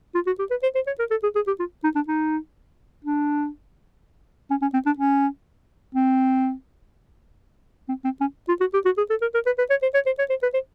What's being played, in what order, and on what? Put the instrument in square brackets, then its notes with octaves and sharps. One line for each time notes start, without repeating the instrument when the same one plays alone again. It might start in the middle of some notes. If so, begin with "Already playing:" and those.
[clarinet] F4
F#4
G4
B4
C5
C5
C#5
A#4
A4
G#4
G#4
G4
F4
D#4
D4
D#4
D4
C#4
C#4
C4
D4
C#4
C4
C4
C4
C#4
F4
F#4
G4
F#4
G#4
A4
A#4
A#4
B4
B4
C#5
C5
C#5
C5
C#5
C5
B4
C5